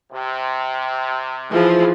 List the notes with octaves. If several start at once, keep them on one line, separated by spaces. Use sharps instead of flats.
C3
E3 F3 G#4